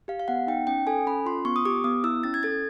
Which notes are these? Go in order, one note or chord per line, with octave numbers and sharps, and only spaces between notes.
G4 F5
F5
B3 F#5
D#4 G5
C#4 G5
A4 G#5
C#4 B5
F4 C6
B3 C#6
D#6
G4 D6
B3 D#6
E4 E6
C#4 A6
G#6
A4 A6